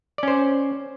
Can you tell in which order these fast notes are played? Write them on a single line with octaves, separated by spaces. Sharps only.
D5 C#4 C5